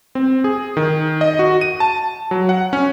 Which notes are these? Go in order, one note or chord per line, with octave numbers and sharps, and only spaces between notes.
C4
G#4
D#3
D#5
F#4
D#7
A5
F#3
F#5
C#4